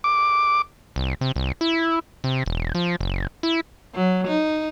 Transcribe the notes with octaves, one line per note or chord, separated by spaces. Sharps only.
D6
C2
C3
C2
E4
C3
E1
F3
F#1
E4
F#3
D#4